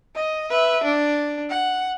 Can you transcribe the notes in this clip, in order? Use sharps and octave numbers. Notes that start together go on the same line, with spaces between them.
D#5
B4 E5
D4
F#5